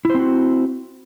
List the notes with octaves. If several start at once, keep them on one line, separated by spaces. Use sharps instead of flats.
C4 E4 F#4 C5